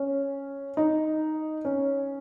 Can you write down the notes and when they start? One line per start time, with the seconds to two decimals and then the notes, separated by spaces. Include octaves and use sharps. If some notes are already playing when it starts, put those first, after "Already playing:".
Already playing: C#4
0.77 D#4
1.65 C#4